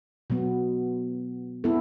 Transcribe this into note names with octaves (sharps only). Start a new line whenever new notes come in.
B2 F#3 B3
B3 E4 A4